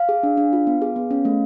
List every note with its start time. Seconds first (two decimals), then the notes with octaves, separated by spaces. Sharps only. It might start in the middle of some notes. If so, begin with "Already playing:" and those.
Already playing: F5
0.09 G#4
0.23 D4
0.37 D4
0.53 F4
0.67 B3
0.82 G#4
0.96 B3
1.11 C#4
1.25 A3